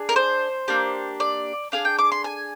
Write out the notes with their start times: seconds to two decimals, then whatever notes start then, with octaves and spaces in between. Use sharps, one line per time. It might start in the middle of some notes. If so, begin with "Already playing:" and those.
Already playing: D4 G#4
0.09 A#4
0.16 C5
0.68 A#3 D4 G4
1.20 D5
1.72 D4 G#4 F5
1.85 G5
1.99 D6
2.12 C6
2.24 G#5